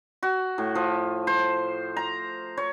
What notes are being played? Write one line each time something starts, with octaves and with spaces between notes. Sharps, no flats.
F#4
A2
F3
C5
A#5
C#5